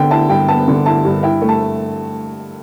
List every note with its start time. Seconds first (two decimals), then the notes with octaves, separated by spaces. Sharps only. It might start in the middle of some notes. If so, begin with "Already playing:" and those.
Already playing: D3 B3 G5
0.10 E4 A5
0.29 G2 G5
0.48 B3 A5
0.68 D3
0.86 E4 A5
1.05 G2
1.23 E4 G5
1.42 A3
1.49 A5